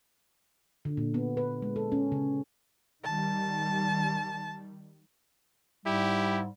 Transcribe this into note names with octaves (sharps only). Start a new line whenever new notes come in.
D3
A#2
B3
B4
G#3
A4
C#4
C#3
D#3 G3 A5
G#2 G3 E4 G4